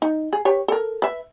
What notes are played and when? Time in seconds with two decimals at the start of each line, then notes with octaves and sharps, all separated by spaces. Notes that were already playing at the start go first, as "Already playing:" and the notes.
0.02 D#4
0.33 G#4
0.45 G4 B4 C#5
0.68 A4 A#4
1.02 B4 E5